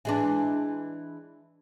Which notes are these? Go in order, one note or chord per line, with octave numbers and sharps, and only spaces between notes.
E3 G#3 D4